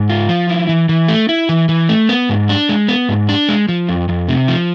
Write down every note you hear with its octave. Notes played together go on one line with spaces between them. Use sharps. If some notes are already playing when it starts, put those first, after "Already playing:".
Already playing: G#2
F4
F3
E4
E3
E3
A3
E4
E3
E3
A3
B3
G#2
D4
G#3
B3
G#2
D4
G#3
F3
F2
F2
C3
F3